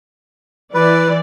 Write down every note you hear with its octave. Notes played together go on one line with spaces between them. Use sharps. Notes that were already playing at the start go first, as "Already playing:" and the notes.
E3 B4 D5